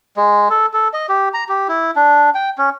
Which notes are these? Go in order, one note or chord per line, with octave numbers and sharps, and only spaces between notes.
G#3
A4
A4
D#5
G4
A#5
G4
E4
D4
G5
C#4